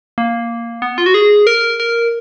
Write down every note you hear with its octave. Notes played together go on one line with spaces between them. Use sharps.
A#3
B3
F4
F#4
G#4
A#4
A#4